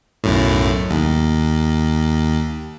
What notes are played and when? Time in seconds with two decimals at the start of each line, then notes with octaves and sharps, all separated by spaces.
0.24 B1 F#2 A2
0.91 D#2